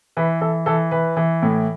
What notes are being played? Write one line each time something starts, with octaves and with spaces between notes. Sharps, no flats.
E3 B4
E3 A4
E3 A4
E3 B4
E3
A2